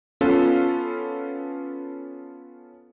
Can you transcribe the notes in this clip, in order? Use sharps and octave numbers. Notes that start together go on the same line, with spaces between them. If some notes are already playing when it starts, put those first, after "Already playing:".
B3 C#4 F4 A4 B4